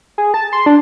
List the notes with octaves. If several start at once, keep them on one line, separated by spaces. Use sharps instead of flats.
G#4
A5
C6
D4